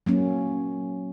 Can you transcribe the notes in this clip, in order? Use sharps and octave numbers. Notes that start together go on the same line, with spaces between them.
F#3 A#3 C#4